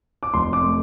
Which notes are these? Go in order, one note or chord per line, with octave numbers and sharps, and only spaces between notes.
D6
F1 C6
D6
A3